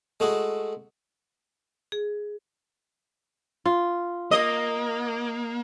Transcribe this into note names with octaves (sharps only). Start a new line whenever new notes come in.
G#3 A3 E4 F#4 G#4
G#4
F4
A#3 D#5